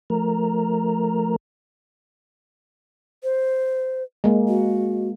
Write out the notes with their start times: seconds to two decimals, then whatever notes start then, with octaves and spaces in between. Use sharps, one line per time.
0.10 F3 A3 A#4 A#5
3.24 C5
4.24 G#3 A#3
4.48 F#4